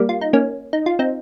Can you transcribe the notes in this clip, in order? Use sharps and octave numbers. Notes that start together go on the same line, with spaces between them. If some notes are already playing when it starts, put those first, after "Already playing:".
Already playing: G3 A#3
F4
D#4
A#3 C#4
D#4
F4
C4 D#4